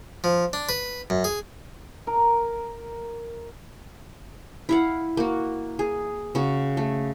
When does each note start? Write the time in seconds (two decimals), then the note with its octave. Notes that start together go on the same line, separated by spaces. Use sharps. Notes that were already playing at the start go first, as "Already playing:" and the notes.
0.24 F3
0.53 D4
0.69 B4
1.10 F#2
1.24 G#4
2.07 A#4
4.69 E4 F5 F#5
5.17 A#3 F#4
5.79 G#4
6.35 C#3 F#4
6.77 A3